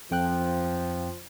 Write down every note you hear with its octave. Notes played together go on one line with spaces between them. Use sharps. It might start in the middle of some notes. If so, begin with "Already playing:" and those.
F2 F3 G5 F#6